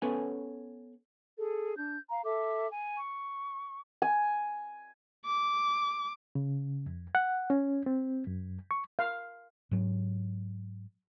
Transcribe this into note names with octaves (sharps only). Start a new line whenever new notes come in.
B3 C#4 A4 B4 C#5 G#5
G#4 A4
D4 G6
F5 A#5
A4 E5 D6
G#5
C#6
G#5
D6
C#3
F2
F#5
C#4
C4
F#2
C#6
F5
G#2 F#3